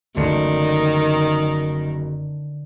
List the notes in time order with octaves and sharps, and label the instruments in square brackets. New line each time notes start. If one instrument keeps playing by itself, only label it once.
[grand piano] F#1 A3 C#7 [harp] D3 [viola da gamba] D#3